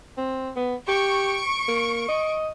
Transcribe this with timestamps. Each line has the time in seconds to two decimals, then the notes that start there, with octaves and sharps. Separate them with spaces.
0.18 C4
0.56 B3
0.88 G4 C#6 D7
1.68 A#3
2.08 D#5